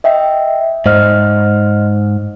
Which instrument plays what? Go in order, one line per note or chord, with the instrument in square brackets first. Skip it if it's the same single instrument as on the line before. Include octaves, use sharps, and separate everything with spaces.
[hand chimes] D#5 E5 G5
[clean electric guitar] G#2 [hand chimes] C5 D#5 F6